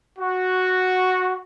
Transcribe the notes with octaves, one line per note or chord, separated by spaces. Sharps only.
F#4